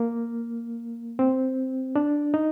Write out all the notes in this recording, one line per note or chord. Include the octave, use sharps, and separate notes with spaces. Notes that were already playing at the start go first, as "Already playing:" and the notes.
Already playing: A#3
C4
D4
D#4